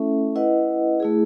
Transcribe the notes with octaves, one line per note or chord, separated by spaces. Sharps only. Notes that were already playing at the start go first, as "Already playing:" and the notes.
Already playing: A3 C#4 E4 A4 E5
E4 B4 D#5 F#5
A3 E4 G#4